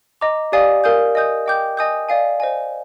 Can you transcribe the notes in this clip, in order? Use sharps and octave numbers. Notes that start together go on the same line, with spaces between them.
D#5 A#5 D6
G4 D5 F5 G#5 D#6
A#4 F5 G#5 D#6 G6
D#5 G#5 D#6 G6
D#5 G5 D6 G6
D#5 G#5 D#6 G6
D5 F5 G#5
C5 D#5 G#5